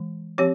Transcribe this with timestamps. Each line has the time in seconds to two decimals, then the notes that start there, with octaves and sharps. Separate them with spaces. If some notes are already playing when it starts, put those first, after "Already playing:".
Already playing: E3 G#3
0.38 F3 C4 G4 C#5